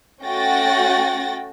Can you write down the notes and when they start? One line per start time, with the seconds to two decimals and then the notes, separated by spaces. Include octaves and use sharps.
0.23 A3 C#4 F#4 G5 A6 A#6